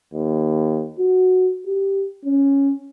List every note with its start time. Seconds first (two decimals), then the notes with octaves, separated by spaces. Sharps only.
0.14 D#2
0.99 F#4
1.66 G4
2.25 C#4